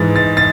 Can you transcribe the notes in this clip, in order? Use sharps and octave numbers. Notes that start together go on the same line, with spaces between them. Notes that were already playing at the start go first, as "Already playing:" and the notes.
Already playing: G#2 E3 G#3 A6
A6
A6